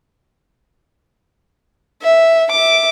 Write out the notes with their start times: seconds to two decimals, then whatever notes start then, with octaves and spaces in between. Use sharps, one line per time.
2.03 E5
2.52 E5 D6